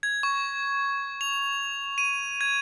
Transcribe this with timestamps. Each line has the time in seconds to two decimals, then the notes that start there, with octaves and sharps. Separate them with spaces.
0.03 G#6
0.23 C#6
1.21 F7
1.98 D#7
2.41 G#6